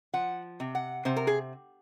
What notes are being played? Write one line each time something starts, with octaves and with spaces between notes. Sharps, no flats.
F3 F#5
C3
F#5
C3 C5
A#4
G#4